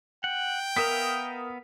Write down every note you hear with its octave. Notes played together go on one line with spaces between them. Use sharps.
F#5 G5
B3 A#4 E5 F5 D#6 B6